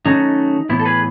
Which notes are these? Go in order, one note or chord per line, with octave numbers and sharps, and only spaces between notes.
D#3 F#3 A3 C#4 D#4
A2 E3 B3 E4
A4
G#4 B4